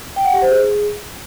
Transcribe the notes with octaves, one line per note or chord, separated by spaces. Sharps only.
G5
F#5
G4
C5
G#4